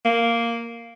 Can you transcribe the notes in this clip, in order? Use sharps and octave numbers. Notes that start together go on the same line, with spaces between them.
A#3